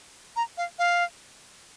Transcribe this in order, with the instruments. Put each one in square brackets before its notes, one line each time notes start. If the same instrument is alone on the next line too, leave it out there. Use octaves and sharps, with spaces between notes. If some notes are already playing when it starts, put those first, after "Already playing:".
[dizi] A#5
F5
F5